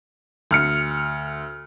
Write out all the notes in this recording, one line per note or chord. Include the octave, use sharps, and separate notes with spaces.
D2 F6 C#7